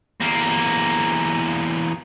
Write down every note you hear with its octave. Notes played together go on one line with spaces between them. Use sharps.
E2 A#3